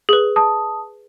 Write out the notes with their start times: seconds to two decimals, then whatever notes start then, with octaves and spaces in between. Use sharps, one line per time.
0.09 G#4 B4
0.36 A5 D#6